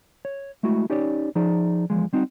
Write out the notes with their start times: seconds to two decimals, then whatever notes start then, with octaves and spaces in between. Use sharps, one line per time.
0.25 C#5
0.63 G#3 A3 E4 F#4
0.90 C#4 D#4 G4 C#5 D5
1.35 F3 D#4 G#4 D5
1.90 E2 F3 G#3
2.13 G3 C4 D#4 F#4